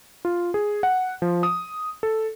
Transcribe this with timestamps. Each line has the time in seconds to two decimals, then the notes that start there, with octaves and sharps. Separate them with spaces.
0.25 F4
0.54 G#4
0.83 F#5
1.22 F3
1.43 D#6
2.03 A4